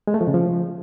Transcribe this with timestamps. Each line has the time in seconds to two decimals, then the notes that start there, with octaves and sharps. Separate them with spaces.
0.07 G#3
0.14 A3
0.21 F3
0.28 C#3
0.34 F3